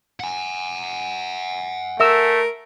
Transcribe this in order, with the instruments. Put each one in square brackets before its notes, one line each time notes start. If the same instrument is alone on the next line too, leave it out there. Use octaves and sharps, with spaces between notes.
[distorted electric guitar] F#5 G#5
[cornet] A3 [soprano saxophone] A#4 [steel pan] E5 E6